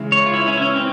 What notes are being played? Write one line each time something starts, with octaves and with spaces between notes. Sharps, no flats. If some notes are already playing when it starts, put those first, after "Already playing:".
Already playing: C#3 E3 G#3
C#5
F4
E4
C#4
E4
C#4
C4